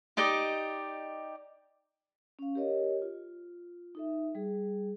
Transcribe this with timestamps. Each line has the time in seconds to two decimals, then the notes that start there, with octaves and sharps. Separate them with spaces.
0.17 D#4 G4 D5 D#5
2.39 C#4 F5
2.55 G4 A#4 C#5 D#5
3.02 F4
3.95 D#4 A4 E5
4.35 G3 G#4